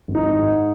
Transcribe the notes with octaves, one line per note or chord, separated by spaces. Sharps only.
G#1
D#4
G#1
G#2